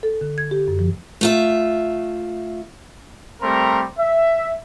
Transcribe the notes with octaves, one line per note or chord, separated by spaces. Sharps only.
A4
D3
G#6
G4
F#2
F3
A3 F4 E5
G3 A3 C4 A#4 A#5 C6
E5